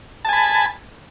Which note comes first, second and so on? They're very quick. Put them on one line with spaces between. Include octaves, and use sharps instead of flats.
A5 G#5 B5